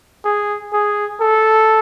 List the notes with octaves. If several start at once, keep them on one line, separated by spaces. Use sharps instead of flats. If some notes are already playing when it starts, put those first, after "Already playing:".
G#4
G#4
A4